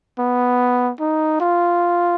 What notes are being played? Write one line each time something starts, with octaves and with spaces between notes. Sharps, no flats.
B3
D#4
F4